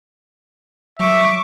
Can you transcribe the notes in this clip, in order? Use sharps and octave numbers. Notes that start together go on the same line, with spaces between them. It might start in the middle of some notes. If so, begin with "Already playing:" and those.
F#3 E5 C#6 D6